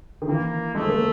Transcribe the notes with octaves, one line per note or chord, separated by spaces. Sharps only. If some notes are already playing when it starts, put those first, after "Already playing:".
D#3
E3 A#3
G#3 A3
A#3